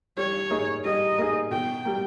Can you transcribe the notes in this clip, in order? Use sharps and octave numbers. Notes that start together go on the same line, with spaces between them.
G3 C#5
A#3 D#4 G#4
G3 D#5
A#3 D#4 G#4
B2 G5
G3 A#3